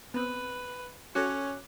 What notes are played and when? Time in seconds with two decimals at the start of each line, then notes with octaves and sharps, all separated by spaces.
0.14 B3 C4 B4
1.15 C#4 F#4 A4 C#5 D6 F#6